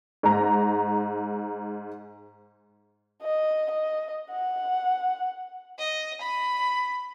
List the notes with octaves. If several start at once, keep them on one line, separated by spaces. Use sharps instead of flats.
G#2 A#5
D#5
D#5
F#5
D#5
B5